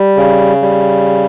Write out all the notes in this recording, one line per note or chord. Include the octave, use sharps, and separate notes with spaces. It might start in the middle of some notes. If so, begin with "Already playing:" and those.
Already playing: G3
C#3
G3